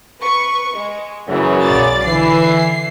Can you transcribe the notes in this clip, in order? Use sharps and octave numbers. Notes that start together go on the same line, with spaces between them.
B4 C#6
G#3
F#2 C#3 E3
B1 D5 A6
D3 E3 C7